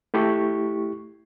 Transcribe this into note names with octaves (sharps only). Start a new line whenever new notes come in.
A3 E4 G4 C#6